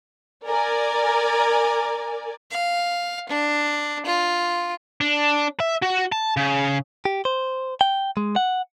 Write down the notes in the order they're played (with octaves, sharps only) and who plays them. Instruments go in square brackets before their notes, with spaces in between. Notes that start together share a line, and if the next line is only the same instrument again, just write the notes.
[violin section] A#4 D5 G#5
[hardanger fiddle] F5
D4
F4
[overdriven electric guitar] D4
E5
F#4
A5
C#3
[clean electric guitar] G4
C5
G5
G#3
F#5